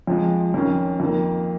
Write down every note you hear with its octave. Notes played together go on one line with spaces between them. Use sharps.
F2 F3 G#3
F2 D#3 C#4
F2 D#3 A#3